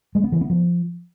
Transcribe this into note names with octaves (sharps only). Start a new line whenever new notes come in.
G#3
B3
E3
B3
F3